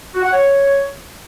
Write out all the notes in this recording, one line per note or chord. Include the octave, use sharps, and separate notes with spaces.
F#4
F#5
C#5